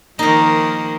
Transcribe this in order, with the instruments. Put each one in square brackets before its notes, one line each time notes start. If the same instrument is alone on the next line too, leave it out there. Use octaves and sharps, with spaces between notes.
[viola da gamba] D#3 F3 A#3 [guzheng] D#4 A#4